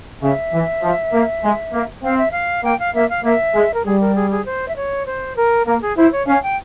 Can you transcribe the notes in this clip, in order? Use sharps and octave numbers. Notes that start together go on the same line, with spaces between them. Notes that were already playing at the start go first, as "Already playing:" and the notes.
C#3 E5
E3
F3
A#3
G#3
A#3
C4 F5
E5
F5
A#3 G5
F5
A#3 E5
F5
A#3 E5
G#3
A#4
G3 G#4
A#4
G#4
G#4
C5
E5
C#5
C5
A#4
A#3 A#4
G#4
E4 C5
C#5
C#4 F5
G5